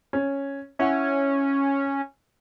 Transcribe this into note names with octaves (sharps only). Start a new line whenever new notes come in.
C#4
C#4 E4 F#5